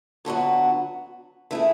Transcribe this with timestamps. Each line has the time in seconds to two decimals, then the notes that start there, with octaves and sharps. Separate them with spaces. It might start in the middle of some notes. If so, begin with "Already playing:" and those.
0.25 D2 D3 F#3 B3 F#4
1.51 E3 A3 E4 G#4